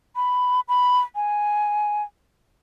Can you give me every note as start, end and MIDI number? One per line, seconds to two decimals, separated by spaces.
0.16 0.60 83
0.69 1.00 83
1.15 2.03 80